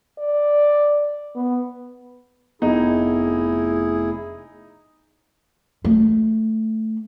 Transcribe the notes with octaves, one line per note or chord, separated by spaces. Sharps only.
D5
B3
F1 B3 D#4 E4 G#4
A3